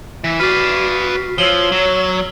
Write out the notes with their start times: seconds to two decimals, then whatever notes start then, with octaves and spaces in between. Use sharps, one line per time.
0.24 E3 B6
0.40 F#4 B4 D5 F6 C7
1.38 F3 C#5 E6 F#7 G7
1.72 F#3